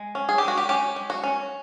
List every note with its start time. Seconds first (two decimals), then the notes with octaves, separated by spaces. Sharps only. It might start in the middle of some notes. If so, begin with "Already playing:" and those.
Already playing: G#3
0.15 C#4
0.29 G#4
0.38 G#3 G4
0.48 F#4
0.57 G4
0.69 C#4 G4
0.96 G#3
1.10 F#4
1.23 C#4